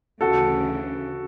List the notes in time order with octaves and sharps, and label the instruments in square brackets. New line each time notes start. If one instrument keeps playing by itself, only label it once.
[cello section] D2 C#3 E3 [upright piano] F#4 A4